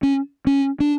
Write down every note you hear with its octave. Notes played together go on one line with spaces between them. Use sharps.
C#4
C#4
D4